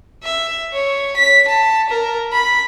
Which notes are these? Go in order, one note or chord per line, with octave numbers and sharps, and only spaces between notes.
E5
C#5
B6
A5
A#4
B5